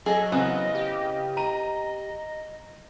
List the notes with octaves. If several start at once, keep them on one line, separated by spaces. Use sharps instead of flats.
F#3 G#4 A4 D#5
C#3 E3 B3 C4
G4
D#5 A#5 D#7